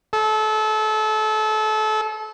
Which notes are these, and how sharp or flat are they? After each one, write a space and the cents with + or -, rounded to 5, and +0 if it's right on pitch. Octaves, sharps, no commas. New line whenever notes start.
A4 -30